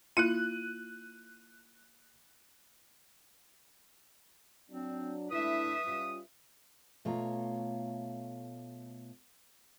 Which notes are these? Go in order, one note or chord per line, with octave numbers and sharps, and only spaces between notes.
A#3 E4 F4 F#6 D#7
F#3 C4 D4
A3 D4 E4 B4 E5 D#6
G3 C#4 F4
B2 A3 F4 C#5 A#5